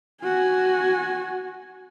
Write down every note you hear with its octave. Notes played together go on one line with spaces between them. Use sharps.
F#4 G#5